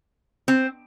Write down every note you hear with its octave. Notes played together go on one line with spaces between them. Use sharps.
C4